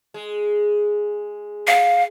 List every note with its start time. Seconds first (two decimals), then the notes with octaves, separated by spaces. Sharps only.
0.14 G#3
1.67 F5